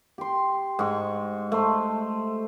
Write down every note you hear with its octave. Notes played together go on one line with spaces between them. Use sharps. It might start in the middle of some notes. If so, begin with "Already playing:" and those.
G4 C6
G#2 C#6
A3 C5